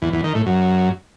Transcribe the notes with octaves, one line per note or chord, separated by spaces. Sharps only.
E2
E2
D#3
A2
F#2